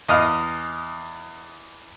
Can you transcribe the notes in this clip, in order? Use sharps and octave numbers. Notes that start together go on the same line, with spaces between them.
E2 D#5 F5